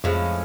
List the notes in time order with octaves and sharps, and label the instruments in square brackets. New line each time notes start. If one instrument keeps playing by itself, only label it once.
[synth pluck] F2 [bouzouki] A2 F3 G#3 C#4